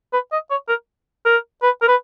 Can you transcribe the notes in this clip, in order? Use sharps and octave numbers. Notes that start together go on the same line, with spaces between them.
B4
D#5
C#5
A#4
A#4
B4
A#4
B4